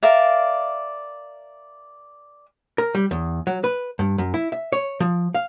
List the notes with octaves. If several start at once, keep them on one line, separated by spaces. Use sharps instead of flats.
A#4 D5 E5 F5
A#4
G3
E2
F#3
B4
G2
F#2
E4
E5
C#5
F3
F5